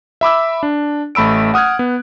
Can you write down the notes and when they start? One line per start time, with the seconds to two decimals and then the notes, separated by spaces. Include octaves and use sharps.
0.21 E5 B5 D6 E6
0.63 D4
1.15 A1 A3 B5 E6 D7
1.54 F#5 D#6 F6 F#6 G#6
1.79 B3